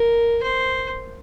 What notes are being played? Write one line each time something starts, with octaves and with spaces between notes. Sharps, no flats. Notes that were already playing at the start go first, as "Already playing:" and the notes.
Already playing: A#4
C5